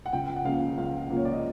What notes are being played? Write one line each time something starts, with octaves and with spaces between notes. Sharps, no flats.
F#5
C#2 G5
F#5
C#3 F3 A#3 F5
C#2 F5
C#3 F3 A#3
C#5
D5
D#5